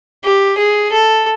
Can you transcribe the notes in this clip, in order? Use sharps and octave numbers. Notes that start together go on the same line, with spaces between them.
G4
G#4
A4